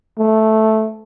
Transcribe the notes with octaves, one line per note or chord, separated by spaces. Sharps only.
A3